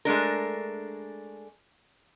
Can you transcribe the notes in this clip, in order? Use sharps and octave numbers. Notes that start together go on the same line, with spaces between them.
G#3 A3 D4 A#4